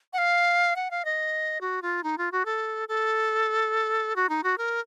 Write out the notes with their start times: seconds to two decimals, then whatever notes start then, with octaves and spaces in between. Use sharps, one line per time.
0.13 F#5
0.18 F5
0.76 F#5
0.91 F5
1.05 D#5
1.61 F#4
1.82 F4
2.04 D#4
2.18 F4
2.32 F#4
2.45 A4
2.89 A4
4.16 F#4
4.29 D#4
4.43 F#4
4.58 A#4